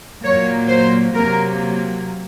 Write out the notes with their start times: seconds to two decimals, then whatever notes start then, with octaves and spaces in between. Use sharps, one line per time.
0.23 A#2 F#3 A#3 C#5
0.68 C5
1.14 C3 F#3 A#3 A#4